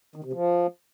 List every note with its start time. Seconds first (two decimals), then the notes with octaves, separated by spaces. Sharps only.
0.16 D#3
0.24 C3
0.33 F3